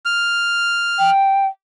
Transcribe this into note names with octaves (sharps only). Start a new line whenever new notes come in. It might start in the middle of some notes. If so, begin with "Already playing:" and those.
F6
G5